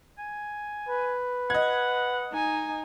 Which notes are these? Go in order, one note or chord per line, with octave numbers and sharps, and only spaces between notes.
G#5
B4
D#5 F#5 G#6
D#4 G#5